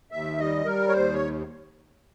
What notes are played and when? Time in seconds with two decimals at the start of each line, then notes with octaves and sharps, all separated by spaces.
0.12 D#2 E5
0.39 G3 D#5
0.65 G3 A#4
0.89 C#5
0.93 D#2 C5
1.13 C#5